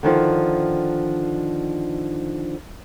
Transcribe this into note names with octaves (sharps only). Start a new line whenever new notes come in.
D3 D#3 F3 D4